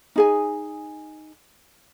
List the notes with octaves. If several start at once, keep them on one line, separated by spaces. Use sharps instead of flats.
D#4 G#4 G#5